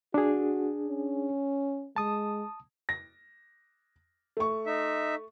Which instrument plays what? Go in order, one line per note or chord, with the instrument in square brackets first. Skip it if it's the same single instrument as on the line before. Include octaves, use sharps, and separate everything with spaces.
[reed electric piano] D4 G#4 [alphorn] F#4
[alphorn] C#4
[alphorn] G#3 [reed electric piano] A5 D#6
[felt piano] A#6
A3 C#6
[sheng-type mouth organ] D#4 E5